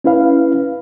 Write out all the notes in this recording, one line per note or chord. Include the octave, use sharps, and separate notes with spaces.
C#4 E4 B4 F5